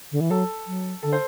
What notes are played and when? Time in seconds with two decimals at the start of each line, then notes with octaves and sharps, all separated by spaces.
0.12 D3
0.21 E3
0.30 F#3 A4
0.67 F#3
1.03 D3 A4
1.12 C5